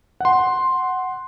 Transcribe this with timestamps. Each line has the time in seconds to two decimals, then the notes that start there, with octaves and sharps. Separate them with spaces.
0.20 F#5 C6